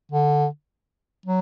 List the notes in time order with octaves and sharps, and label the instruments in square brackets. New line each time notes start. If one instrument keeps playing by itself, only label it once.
[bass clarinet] D3
F#3